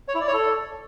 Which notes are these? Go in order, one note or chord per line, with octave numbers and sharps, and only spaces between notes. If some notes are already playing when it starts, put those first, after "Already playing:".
C#5
E4
D5
C#5
A4